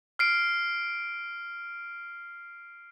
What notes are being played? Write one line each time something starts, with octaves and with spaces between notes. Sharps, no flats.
F6 C7 D7